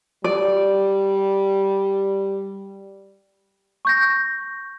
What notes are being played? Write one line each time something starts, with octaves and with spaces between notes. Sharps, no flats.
G3 D5
C#6 G6 A#6